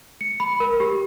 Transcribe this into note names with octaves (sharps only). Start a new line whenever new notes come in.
C#7
B5
A#4
G4